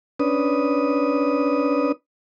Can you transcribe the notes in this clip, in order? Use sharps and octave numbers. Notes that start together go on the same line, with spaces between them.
C#4 D4 B4 D#6